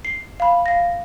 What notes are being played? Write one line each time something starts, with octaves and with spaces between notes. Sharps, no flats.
C7
F5 B5
F5 A#6